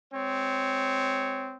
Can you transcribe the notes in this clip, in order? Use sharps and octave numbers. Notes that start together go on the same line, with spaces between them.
G#3 C4 C#5